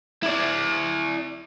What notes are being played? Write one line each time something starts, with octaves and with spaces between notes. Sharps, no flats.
E4 D5